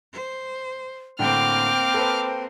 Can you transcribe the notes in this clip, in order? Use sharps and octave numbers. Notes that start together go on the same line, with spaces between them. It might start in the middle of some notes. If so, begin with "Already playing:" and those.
C5
A2 D3 A3 A#3 C4 G5 D6 F6
A4 B4 C5